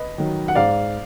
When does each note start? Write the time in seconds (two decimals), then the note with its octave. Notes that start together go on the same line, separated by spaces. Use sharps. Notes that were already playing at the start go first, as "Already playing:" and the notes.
Already playing: B4 D#5
0.18 D#3 F#3
0.48 F#5
0.55 G#2 D5 F5